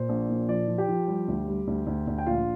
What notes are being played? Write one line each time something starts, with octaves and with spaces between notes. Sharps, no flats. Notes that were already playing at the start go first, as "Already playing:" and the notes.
Already playing: A#2 C5
A#1
A#2
F3 D5
F3
G4 G5
F3
G3
D2
G3
D2
D2
D2
G5
A#1 F4 F5